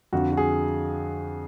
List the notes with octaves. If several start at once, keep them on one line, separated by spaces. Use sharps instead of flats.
F2 D3 F#4
F#4
G#4